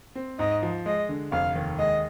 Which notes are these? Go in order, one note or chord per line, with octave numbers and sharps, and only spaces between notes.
C4
G#2 D#5
F3
G#3 D#5
D3
F1 F5
D#2
G#3 D#5